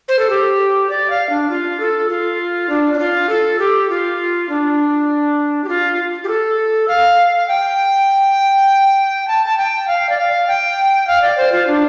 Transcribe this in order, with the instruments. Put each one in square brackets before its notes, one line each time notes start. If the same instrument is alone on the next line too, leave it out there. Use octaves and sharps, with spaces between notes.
[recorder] C5
A4
G4
D5
F5
D4
F4
A4
F4
D4
D4
F4
A4
G4
F4
D4
G4
F4
G4
A4
F5
F5
G5
A5
A5
G5
F5
D5
F5
G5
F5
D5
C5
F4
D4